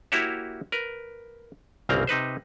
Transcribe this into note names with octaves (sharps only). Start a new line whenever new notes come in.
A#3 E4 F#4 G4 C#5 E5
A#4 B4
G1 C2 C#3 A#3 C4 A#5
C3 D#4 B4 C5